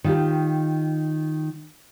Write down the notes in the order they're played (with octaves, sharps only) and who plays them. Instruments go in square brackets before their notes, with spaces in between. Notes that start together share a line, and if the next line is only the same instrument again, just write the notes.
[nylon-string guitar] D#3 F4 G4